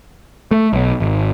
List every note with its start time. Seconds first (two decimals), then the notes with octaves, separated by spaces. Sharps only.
0.51 A3
0.73 B1
1.00 G#1